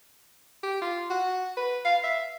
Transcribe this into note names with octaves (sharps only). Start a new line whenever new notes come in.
G4
F4
F#4
B4
F5
E5